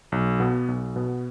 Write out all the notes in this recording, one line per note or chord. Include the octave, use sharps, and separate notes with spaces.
B1
B2 B3
B1
B2 B3